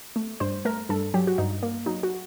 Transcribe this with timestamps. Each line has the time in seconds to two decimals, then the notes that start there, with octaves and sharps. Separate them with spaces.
0.16 A3
0.40 G2 C5
0.65 A3 A#4
0.89 G2 A4
1.14 F#3 G4
1.27 F#4
1.38 G2 D#4
1.63 A#3
1.86 F#3 D#4
2.03 F#4